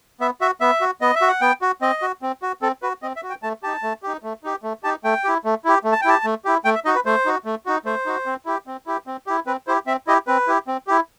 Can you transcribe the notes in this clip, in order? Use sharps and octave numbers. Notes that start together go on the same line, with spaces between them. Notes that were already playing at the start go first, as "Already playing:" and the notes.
B3 E5
F#4 E5
B3 E5
F#4
B3 D#5
E5
F#4
F#5
B3 G5
F#4
C4 D#5
F#4
C4
F#4
C4 A4
F#4 B4
C4 D#5
E5
F#4
G5
A3 A5
D#4 G4 A5
A3
D#4 G4
A3
D#4 G4
A3
D#4 G4 A5
A3 G5
E4 G4
A3
E4 G4
A3
A5
G5
E4 G4 A5
A3
E4 G4
A3 G5
E5
D#4 F#4 D#5
B4
A3 C5
D#4 F#4
A3
D#4 F#4
A3 C5
D#4 F#4
C4
E4 G4
C4
E4 G4
C4
E4 G4
C4 B4
E4 G4 C5
C4 E5
E4 G4 D#5
C4 B4
E4 G4
C4
E4 G4